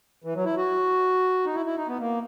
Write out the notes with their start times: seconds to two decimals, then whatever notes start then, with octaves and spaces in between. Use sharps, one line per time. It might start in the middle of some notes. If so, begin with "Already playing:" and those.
0.24 E3
0.35 F#3
0.45 E4
0.56 F#4
1.45 D#4
1.55 E4
1.66 E4
1.77 D#4
1.88 B3
1.99 A#3